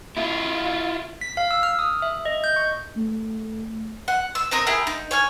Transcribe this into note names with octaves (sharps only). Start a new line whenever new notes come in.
E4 F4
B6
F5
E6
F6
D#6
E5
D#5
G6
C#6
A3
F#5
E6
C4 D#4 A#4 D#6
E4 G4 G#4 A#4
D#4
C#5 G#5 F6